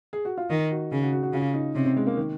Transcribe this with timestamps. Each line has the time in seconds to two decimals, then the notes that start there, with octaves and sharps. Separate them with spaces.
0.13 G#4
0.25 F#4
0.38 F4
0.50 D#3 D#4
0.71 F#4
0.92 C#3 G#4
1.02 F#4
1.13 F#4
1.23 F#4
1.33 C#3 F4
1.54 D#4
1.75 C3 C#4
1.86 C4
1.96 G#3
2.07 A#3
2.17 D#3